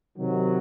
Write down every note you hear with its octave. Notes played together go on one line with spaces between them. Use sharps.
C3 D#3 F#3